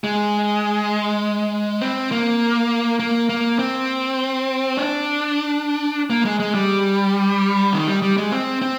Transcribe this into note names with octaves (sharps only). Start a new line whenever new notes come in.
G#3
C4
A#3
A#3
A#3
C4
D4
A#3
G#3
G#3
G3
D#3
G3
G3
G#3
C4
C4